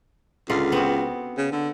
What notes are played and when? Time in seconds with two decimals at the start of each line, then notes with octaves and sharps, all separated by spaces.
0.50 C#2 D3 F4
0.72 B3 C4 F#4
1.37 C#3
1.52 D3